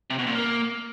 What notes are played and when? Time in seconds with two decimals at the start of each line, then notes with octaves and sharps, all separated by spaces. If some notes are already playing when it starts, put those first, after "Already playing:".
0.10 C3
0.18 B2
0.27 A#2
0.35 A#3